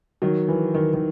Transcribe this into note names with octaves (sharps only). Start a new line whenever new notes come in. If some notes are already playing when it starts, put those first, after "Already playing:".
D#3 F#3
E3
D#3
D#3